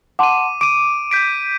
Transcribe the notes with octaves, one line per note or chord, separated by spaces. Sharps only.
F#5 A5 C6 D6 D#7
D6 D7 D#7
G6 B6 D7